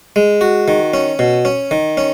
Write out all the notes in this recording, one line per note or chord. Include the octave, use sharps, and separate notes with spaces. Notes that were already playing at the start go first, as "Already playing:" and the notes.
G#3
F#4
D#3
C#4
B2
C#4
D#3
C#4